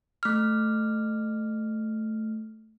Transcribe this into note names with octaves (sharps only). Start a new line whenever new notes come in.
A3 F6